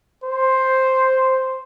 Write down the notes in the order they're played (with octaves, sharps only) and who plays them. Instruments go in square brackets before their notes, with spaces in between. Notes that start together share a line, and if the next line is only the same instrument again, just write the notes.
[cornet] C5